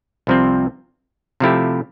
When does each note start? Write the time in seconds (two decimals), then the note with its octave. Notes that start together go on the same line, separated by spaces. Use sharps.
0.27 C2 C3 F3 C4
1.40 C3 F3 A3 E4 G4